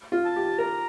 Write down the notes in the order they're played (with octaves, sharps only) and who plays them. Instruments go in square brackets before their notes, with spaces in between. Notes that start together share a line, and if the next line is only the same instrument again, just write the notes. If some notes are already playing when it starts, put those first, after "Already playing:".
[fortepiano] F4
[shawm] A5
[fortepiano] G4
[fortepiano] A#4 [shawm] A#5